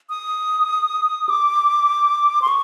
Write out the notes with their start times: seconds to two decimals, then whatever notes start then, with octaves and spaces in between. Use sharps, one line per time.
0.10 D#6
1.29 D6
2.42 C6
2.48 C#6